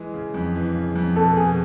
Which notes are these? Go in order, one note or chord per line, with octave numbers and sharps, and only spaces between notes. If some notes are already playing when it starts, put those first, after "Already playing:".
Already playing: E3 G#3
C#3
F2
E3
C#3
F2
B2 A4
B2 G#4